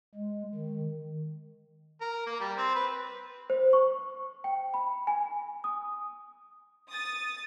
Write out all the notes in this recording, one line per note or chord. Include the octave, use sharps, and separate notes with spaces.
G#3
D#3
A#4
A#3
G3
C4
B4
C5
C#6
G5
B5
G#5
D#6
D#6 A6